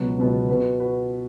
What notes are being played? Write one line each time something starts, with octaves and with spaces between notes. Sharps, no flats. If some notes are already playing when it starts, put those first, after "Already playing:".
Already playing: C#2 B2 F#3 B3
C#2 B2 F#3 B3
B2 B3 F#4 B4
F#4 B4